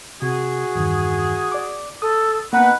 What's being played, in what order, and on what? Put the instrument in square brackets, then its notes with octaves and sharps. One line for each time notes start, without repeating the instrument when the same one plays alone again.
[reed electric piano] C3 [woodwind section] F#4 G#4
[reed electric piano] E2 G2 D#3
D5 D6
[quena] A4 [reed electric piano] D#6
[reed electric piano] A#3 B3 [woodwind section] D#4 B4 [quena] F#5